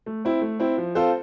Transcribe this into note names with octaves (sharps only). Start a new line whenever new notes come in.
A3
C4 E4
A3
C4 E4
F3
C4 F4 A4 C5